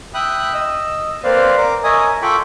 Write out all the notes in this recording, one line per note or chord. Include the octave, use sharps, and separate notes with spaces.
E5 G5 B5 D#6 F#6
D#5 E6
A#3 C4 B4 C5 D5 F5
A#4 D6
A#4 C#5 D#5 E5 G#5 D#6
F4 A4 G5 B5 C#6 D6